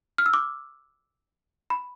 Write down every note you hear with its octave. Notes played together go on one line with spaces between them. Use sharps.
F6
E6
D6
B5